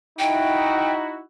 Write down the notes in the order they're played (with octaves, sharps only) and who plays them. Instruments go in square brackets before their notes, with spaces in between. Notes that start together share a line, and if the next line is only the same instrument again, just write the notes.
[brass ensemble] D#4 E4 F#4 [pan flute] G5